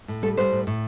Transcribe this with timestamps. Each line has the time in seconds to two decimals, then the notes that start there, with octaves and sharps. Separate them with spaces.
0.08 A2
0.22 G3 A4
0.37 G3 C5
0.52 A2
0.67 A2